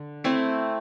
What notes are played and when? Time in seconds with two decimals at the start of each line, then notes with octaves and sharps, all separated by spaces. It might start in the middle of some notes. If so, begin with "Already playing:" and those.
Already playing: D3
0.24 A3 C4 E4